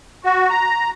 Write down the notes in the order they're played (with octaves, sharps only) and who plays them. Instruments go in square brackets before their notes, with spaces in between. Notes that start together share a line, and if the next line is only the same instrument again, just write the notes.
[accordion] F#4
A#5